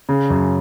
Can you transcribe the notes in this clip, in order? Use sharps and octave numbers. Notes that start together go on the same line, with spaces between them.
C#3
F#2